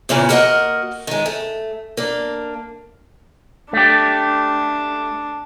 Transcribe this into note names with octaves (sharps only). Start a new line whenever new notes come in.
E2 A#2 C#3 E3
A#3 F#4 A#4 D5 D#5 F#5
D#3 G#3
A3
A#3 D4
A3 D4 G4